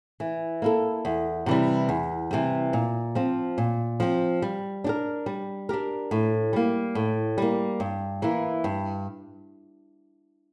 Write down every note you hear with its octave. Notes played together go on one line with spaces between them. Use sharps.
E3
A#3 E4 A4
E2
C3 E3 G3
E2
C3 E3 G3
A#2
F3 C4
A#2
F3 C4
G3
D4 G4 A#4
G3
D4 G4 A#4
A2
G3 A#3
A2
G3 A#3
G2
E3 A#3 E4
G2